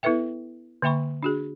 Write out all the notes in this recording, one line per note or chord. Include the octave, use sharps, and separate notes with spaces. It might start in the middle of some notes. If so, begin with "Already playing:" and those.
B3 E4 A4 B4 E5 G5
D3 A#3 E5 G5 B5 C#6
D4 F#4 G#4